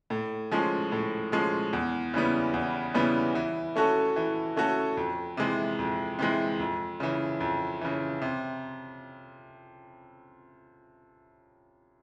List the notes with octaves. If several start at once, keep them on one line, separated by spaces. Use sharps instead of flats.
A2
F3 G#3 C#4
A2
F3 G#3 C#4
E2
C#3 E3 G3 B3
E2
C#3 E3 G3 B3
E3
A3 C#4 F#4 A4
E3
A3 C#4 F#4 A4
F2
C3 E3 G#3
F2
C3 E3 G#3
F2
C#3 E3
F2
C#3 E3
C3